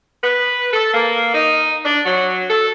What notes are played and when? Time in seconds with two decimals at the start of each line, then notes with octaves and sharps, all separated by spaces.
0.24 B4
0.73 A4
0.94 A#3
1.34 D#4
1.85 D4
2.06 F#3
2.50 A4